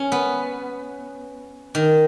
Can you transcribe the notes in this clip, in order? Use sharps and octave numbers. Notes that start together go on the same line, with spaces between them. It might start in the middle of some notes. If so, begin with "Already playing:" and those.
Already playing: C#4
B3
D#3